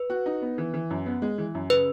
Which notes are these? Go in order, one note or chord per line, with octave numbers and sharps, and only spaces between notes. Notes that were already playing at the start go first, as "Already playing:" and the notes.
Already playing: B4
F#4
D#4
B3
E3
E3
F#2
B3
G#3
E3
F#2
C#3 B4